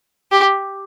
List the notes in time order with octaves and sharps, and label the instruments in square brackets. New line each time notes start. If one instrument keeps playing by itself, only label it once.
[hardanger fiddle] G4